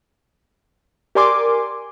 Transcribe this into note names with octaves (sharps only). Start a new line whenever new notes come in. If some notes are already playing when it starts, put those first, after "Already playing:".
G4 A#4 D5 G#5 C6 D6